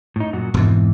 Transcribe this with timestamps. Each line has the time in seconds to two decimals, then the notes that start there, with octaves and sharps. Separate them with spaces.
0.16 A2 D#4
0.33 F#2 A#2 F#4
0.54 E1 F2 G#2 E3